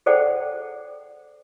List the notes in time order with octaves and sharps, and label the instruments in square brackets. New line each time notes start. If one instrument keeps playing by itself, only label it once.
[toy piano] G#4 A4 C5 D5 F#5 G5